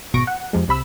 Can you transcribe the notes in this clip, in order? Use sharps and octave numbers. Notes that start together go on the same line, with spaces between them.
G#1 B2 C#6 A#6 D7
F#5
F2 C3 F3 G#3
C2 C3 B5 E6